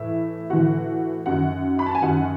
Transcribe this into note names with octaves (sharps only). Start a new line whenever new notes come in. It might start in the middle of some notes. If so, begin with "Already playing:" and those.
Already playing: A2 E3 E4 E5
A2 E3 F#4 F#5
F#2 D#3 F#4 F#5
B5
A5
G#5
F#2 D#3 F#4 F#5